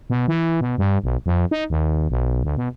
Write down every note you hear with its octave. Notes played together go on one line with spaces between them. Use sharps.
B2
E3
B2
G2
B1
F2
D#4
D#2
B1
D2
B2